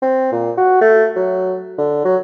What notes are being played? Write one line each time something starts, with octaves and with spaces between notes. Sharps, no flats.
C4
A#2
F#4
A3
F#3
D3
F#3